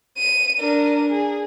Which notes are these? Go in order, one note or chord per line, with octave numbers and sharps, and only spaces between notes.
D#7
D4 A#4
G#4